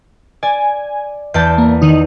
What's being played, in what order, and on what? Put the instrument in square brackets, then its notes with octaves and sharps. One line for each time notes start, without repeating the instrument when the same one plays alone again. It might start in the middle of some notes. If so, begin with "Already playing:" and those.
[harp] D5 [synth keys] G#5
[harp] E2 D5 A5 [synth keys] G6
[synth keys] A#3
D#3 D#4